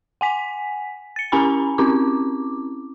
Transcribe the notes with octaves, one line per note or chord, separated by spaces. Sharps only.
F#5 G#5 B6
A6 C#7
C#4 E4 G#5 A#5 B5
C4 C#4 E4 D6